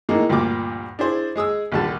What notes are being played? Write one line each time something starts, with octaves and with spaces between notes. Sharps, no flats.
A2 E3 G#3 A#3 D#4
D2 G2 A#2 F3 F4 D6
D4 E4 G#4 C5
G#3 G#4 D#6 E6
A#1 D#2 D3 G3 A5